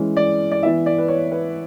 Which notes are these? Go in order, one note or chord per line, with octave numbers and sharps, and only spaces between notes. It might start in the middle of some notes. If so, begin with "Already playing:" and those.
Already playing: E3 G#3 C#4
D5
D5
E3 B3 E4 E5
D5
B4
C#5
B4